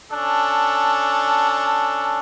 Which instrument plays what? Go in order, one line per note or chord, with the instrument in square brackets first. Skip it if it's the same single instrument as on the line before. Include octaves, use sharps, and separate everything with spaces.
[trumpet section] C#4 D4 A4